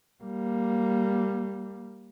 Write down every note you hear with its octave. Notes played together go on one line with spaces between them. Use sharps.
G3 A#3